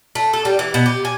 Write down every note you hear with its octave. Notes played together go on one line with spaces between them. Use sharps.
A3
A4
G3
E3
B2
G4
G#5